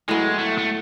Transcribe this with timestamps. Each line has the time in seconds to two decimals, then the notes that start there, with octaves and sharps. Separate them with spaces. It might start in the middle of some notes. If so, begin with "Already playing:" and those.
0.08 A2 F#3 G#3 B3
0.39 A3
0.58 A3